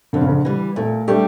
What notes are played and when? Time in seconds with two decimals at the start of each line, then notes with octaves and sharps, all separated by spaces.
0.13 F2 D3
0.21 C#3
0.27 D3
0.45 E3 G3
0.76 A#2 A3
1.08 G3 A3 D4 G4